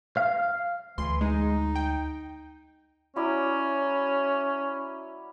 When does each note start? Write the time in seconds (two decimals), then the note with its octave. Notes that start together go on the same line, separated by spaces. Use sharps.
0.17 F5
0.98 D2 E3 C6
1.21 G#3 D#4
1.76 G5
3.16 F#3 C#4 E4 D5